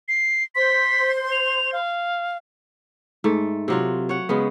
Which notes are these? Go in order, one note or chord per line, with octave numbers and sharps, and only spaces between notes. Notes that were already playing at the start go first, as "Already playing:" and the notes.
C7
C5 C6 B6
F7
F5
G#2 A3
C3 F#3 F4
C#5 F#5
C#3 G#3 B3